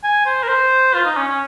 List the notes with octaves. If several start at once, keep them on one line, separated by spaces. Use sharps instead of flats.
G#5
C5
A#4
C5
F4
D#4
C#4
C#4